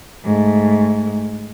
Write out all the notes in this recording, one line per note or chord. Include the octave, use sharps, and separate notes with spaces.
G#2 A3